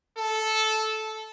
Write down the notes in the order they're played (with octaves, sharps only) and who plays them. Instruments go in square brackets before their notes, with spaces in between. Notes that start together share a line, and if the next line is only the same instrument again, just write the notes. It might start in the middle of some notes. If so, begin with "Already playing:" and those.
[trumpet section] A4